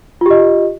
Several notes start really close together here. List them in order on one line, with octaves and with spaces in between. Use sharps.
F4 G4 D#5